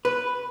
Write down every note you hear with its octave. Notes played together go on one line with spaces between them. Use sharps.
B4